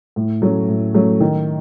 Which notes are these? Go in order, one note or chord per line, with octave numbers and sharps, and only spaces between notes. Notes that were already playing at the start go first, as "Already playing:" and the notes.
A2
F#3 A3 C#4
A2
F#3 A3 C#4
D#3